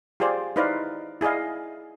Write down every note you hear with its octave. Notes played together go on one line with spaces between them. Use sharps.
F4 G4 G#4 C5 D5
D#4 E4 B4 C5 D5 F5
E4 G#4 D5 D#5 F5